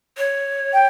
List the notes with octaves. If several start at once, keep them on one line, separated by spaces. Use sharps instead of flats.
C#5
G5